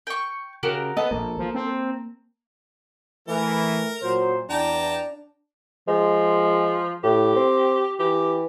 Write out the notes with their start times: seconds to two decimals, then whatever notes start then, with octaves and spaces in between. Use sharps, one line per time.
0.07 G5 C#6
0.63 C#3 F#4 G4 A#4
0.97 B3 A4 D#5
1.11 A#1 A#3
1.38 F3
1.55 C4
3.28 E3 A3 A#4
4.02 A#2 F#3 C5
4.50 E2 D4 G5 A5 A#5
5.88 F3 G#3
7.04 A2 G4
7.36 C4
8.00 E3 G4